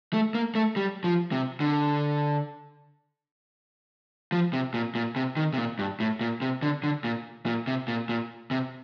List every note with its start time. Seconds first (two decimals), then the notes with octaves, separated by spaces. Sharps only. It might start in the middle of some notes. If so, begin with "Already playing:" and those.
0.13 A3
0.35 A#3
0.55 A3
0.76 G3
1.04 F3
1.32 C3
1.60 D3
4.32 F3
4.53 C3
4.74 A#2
4.95 A#2
5.16 C3
5.37 D#3
5.54 C3
5.58 A#2
5.79 G2
6.00 A2
6.21 A#2
6.42 C3
6.62 D3
6.84 D3
7.04 A#2
7.46 A#2
7.67 C3
7.88 A#2
8.09 A#2
8.51 C3